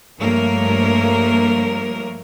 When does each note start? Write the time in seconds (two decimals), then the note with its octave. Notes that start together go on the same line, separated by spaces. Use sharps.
0.19 G2 F3 A3 A#3 A#4 C#5